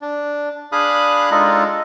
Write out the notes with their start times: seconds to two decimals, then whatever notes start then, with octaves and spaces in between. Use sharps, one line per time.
0.02 D4
0.72 D4 G#4 F5 B5 D#6 F#6
1.31 G#3 D4 D#4 F4 A4 D#5